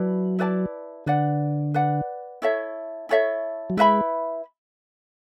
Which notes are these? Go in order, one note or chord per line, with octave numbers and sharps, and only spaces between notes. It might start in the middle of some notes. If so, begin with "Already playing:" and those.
Already playing: F#3 E4 B4 D5 A5
E4 B4 D5 A5
D3 B4 D5 F#5
B4 D5 F#5
E4 A4 C#5 E5
E4 A4 C#5 E5
F#3
G#3 E4 B4 E5 B5